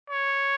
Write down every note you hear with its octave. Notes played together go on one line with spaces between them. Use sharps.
C#5